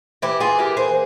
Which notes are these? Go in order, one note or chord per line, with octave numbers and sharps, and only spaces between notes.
E3 E4 G4
F4 G#4
A#3 E4 G4
G#4 C5